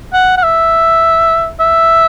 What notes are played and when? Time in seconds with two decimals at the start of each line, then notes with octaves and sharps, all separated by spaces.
0.13 F#5
0.37 F#5
0.43 E5
1.60 E5